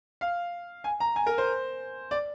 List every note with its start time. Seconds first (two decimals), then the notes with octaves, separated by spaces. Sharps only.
0.21 F5
0.84 G#5
1.00 A#5
1.16 G#5
1.26 A#4
1.38 C5
2.11 D5